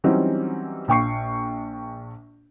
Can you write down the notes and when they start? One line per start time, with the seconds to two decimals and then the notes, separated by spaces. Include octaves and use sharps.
0.04 E3 F#3 G3 C4 C#4 D#4
0.88 A#1 G5 C#6 C7